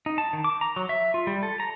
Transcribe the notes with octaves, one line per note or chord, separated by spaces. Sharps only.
D#4
A5
D#3
D6
A#5
F#3
E5
F4
G3
A4
A#5